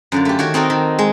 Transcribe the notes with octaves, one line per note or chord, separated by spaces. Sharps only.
F#2 D3 F4
A3 G4
D#3 F#4 C#5
C4 D#4 F#4 A4 A#4
D#3
G#3